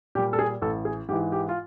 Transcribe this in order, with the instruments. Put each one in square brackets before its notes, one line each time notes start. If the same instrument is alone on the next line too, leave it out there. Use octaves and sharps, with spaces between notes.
[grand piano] A#2 G4
G3
A4
G#4
A1 A4
G#4
G#2 E3 G4
G4
F4